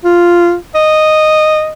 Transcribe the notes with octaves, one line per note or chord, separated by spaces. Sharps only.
F4
D#5